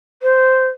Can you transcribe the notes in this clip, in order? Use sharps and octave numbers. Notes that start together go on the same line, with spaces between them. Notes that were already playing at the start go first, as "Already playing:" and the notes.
C5